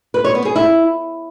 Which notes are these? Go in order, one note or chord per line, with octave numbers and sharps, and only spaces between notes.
B4
C#5
B3
G#4
E4